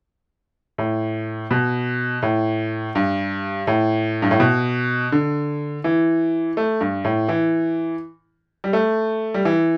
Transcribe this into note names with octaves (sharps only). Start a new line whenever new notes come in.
A2
B2
A2
G2
A2
G2
A2
B2
D3
E3
A3
G2
A2
E3
G3
A3
G3
E3